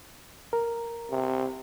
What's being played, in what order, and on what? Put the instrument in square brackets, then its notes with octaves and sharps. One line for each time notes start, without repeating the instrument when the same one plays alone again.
[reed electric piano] A#4
[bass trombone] C3